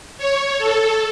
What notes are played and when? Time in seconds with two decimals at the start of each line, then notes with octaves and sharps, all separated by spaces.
0.18 C#5
0.59 A4